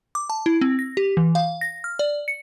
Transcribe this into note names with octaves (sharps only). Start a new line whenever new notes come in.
D6
A5
E4
C4
A#6
G4
E3
F5
A#6
F6
D5
C#7